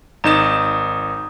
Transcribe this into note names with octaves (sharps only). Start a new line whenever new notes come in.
G#1 D#4 A#5 D#6 E7